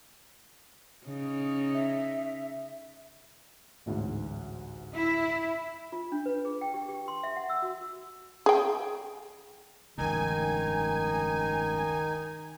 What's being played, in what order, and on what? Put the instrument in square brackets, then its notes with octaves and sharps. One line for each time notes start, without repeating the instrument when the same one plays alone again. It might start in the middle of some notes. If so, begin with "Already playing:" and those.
[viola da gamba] C#3 D#4
[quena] E5
[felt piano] A1 D2 G#2
[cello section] E4
[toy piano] F4
D4
B4
G#4
G5
G4
G4
C6
E5
F#5
E6
F#4
[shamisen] G#4 G5
[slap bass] F1 C#2 G2 [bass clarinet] D#3 [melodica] D#4 [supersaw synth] G#5